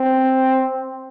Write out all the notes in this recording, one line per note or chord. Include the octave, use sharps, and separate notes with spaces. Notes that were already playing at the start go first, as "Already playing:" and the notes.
Already playing: C4